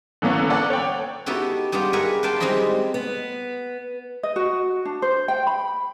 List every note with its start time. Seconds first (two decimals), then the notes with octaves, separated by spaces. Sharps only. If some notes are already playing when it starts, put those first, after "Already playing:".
0.22 D3 E3 A#3 B3 C#4
0.50 A4 B4 D5 F#5
0.70 C#5 G5
1.26 B3 D#4 E4 F#4 G4 A4
1.72 G3 B3 D4 D#4 F4 G4
1.93 G#4 A#4 B4 E5 F#5 G#5
2.23 B4 D5 F5 G5 A5 C6
2.40 G3 G#3 C4 D#4 E4 D#5
2.94 B3
4.23 D#5
4.36 F#4
4.85 D4
5.02 C5
5.28 G5
5.47 B5